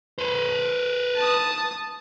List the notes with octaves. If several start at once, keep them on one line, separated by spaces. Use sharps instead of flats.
B4 C5
A5 D#6